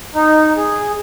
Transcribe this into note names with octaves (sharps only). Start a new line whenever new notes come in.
D#4
G#4